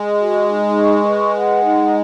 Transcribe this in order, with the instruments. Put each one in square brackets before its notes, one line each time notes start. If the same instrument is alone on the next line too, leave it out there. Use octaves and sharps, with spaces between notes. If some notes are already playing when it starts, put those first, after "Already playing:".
Already playing: [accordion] G#3
[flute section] F#4
D#4
C#6
B4
F#5
D#4